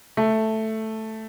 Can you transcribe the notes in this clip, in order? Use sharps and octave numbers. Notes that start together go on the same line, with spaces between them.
A3